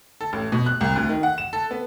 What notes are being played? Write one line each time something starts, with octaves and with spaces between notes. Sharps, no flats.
A4
A1
B2
F#6
C2
D2
D#3
F#5
E7
A4
B3